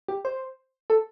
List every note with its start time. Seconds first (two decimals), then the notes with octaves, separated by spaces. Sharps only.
0.08 G4
0.25 C5
0.90 A4